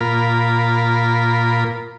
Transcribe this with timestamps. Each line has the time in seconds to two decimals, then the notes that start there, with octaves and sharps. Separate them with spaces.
0.01 A#2 F4 A#4 B5